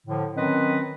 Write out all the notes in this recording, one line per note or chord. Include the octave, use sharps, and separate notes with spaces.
A2 D3 F3
D#3 F#3 C4 C#4 B4 D#5